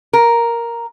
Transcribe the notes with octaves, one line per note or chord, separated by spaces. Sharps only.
A#4